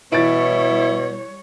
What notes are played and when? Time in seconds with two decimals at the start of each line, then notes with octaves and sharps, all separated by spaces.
0.12 B2 E3 G3 E4 C#5 A6 D7